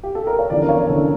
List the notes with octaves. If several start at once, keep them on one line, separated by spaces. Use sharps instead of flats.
G4
A4
A#4
C#5
E2 D3 F3 C#4 D5
A#4
C#5
E2 D3 F3 C#4 A4